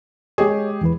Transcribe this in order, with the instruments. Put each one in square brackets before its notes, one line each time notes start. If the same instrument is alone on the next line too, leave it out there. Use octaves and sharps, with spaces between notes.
[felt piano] G#3 G4 G#4 [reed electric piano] C#5 D#5
[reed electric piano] E2 E3 B4